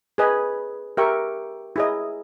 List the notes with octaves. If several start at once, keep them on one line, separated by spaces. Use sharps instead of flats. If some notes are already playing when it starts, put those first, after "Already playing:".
G#4 B4 D#5 G#5 B5
G4 A#4 E5 G5 C#6
E4 G#4 D#5